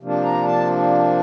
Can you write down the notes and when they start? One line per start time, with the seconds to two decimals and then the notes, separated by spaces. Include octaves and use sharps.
0.01 C3 F3 A#3 D4
0.24 A#5
0.47 A5